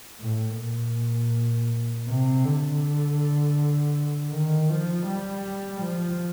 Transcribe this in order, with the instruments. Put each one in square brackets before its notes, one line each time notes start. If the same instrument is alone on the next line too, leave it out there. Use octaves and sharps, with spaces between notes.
[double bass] A2
A#2
C3
D3
D#3
F3
G3
F3